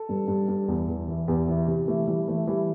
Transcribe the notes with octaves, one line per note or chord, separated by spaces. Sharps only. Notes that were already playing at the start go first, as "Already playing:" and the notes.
Already playing: A4
G2
G2
G2
E2
E2
E3
E2 G4
E3
C3
E3 A3
E3 G3
E3 A3
E3 G3